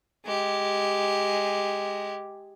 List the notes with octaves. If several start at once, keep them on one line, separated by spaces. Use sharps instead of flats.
G#3 G4